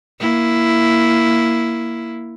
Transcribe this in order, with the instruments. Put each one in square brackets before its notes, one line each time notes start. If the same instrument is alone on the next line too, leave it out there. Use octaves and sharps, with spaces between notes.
[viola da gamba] A#3 E4